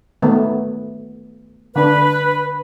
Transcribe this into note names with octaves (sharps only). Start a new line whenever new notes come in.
D#3 A3 B3
D3 D4 B4